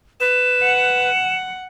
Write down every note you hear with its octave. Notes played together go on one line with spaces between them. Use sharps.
B4 E7
F#5